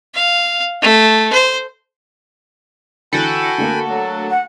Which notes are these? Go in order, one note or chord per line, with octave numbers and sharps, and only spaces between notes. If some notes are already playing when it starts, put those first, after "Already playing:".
F5
A3
C5
D3 E3 F#4 A4 G5 G#5 B5
D3 A3 A#3
F#3
F#5